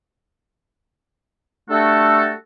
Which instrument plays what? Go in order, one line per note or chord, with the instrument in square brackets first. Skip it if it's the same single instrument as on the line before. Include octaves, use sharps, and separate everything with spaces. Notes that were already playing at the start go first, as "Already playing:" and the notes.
[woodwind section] G3 A3 D4 F#4 A4